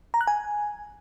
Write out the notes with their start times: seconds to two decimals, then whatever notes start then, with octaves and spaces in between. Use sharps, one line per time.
0.14 A#5
0.21 F#6
0.27 G#5